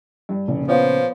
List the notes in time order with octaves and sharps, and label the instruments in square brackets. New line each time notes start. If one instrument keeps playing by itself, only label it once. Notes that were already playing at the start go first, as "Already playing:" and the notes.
[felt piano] G2
[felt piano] F1 [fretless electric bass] A#2 C#3
[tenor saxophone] F3 [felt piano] B3 F4 C#5